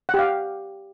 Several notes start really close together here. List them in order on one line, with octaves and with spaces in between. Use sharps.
F#5 G4 F5